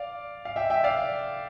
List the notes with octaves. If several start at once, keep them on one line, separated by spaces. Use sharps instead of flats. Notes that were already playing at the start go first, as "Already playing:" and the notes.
Already playing: D5 F5
F5
E5 G5
E5 G5
D5 F5